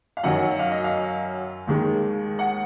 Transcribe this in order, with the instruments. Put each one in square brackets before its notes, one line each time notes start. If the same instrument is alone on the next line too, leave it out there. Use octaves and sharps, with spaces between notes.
[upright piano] F5
F#2 D#3 F#3 F#5
F5
D#5
F5
D#2 D#3 G#3
F#5